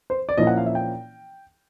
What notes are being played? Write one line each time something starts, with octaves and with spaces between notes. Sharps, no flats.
C5
D5
A#2 F3 A#3 C#4 E4 D#5
F#5
F5
E5
G5